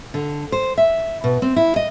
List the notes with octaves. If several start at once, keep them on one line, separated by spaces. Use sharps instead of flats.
D3
C5
E5
B2
C4
E4
D#5